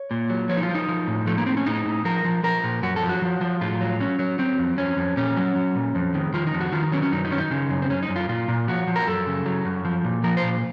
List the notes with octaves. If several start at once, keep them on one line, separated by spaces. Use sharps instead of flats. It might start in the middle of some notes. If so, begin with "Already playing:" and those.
Already playing: C#5
A#2
F#3
F3 C#5
D#4
F4
F3
D#4
F3
A2
F3 A3
A#3
A2 C4
C#4
A2 D#4
A2
F3 A#4
F3
F3 A#4
A#2
F#2 F#4
A4
F3
F#4
F3
F3
A2 F4
F#3
F#3 C#4
F#3
F#3 C4
F2
F2 C#4
F2
A#2 C#4
F#3
F#3
A#2
F2
D#3
D#3 F4
D#4
F2
F#4
D#3 F4
D#4
F#3 C#4
C#4
F#2 D#4
D#4
D#3 C#4
D#4
C#3
F#2
C4
F#2 C#4
D#4
F#2
F4
A#2 F4
A#2
F3 F#4
F3
A#4
F#2 A4
C#3
F#3
F#2
F3
A#2
F3 A#4
C5
A#2